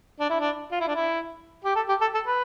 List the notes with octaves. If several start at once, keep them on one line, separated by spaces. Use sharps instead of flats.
D4
E4
D4
F4
E4
D4
E4
G4
A4
G4
A4
A4
B4